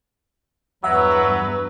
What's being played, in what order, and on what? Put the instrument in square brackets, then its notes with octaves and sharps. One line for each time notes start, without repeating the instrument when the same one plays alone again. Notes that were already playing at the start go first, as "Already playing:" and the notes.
[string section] E2 G2 B4 [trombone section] F#3 [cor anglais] E5 [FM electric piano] F#5